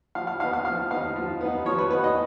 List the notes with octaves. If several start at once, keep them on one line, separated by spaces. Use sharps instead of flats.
F3 F5
F5
B3 D#4 F5
F5
F3 F5
B3 D#4 F5
F3
B3 D#4
F3 C#5
B4
B3 D#4 B4
D#5